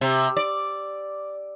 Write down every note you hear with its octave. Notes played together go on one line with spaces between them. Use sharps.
C3
D5